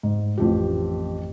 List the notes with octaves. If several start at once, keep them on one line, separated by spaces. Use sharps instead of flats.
G#2
A1 F2 G4